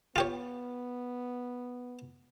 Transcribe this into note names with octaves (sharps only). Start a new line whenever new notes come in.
B3 F4 G4 C#5